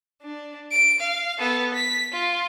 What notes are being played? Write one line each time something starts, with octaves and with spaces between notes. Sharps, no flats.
D4
D7
F5
B3 A4
B6
F4